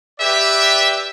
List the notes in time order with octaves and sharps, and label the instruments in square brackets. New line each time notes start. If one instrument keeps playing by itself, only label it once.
[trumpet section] G4 B4 D5 E5